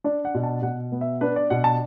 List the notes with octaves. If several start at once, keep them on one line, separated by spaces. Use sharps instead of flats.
D4 D5
F#5
B2
A5
B2 F#5
B3
E5
D4 B4
D5
B2 F#5
A5